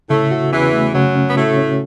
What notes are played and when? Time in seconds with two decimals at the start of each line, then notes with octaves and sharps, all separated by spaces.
0.10 A2 C#3 A3
0.31 F#4
0.52 E2 E3 C#4
0.73 A3
0.94 F#2 C#3 F#3
1.16 C#4
1.30 B3
1.36 A2 A3 F#4
1.58 C#4